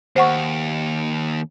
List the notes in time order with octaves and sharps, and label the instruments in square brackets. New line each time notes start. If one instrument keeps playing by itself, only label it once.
[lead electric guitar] D#2 [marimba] C5 F#5 C#6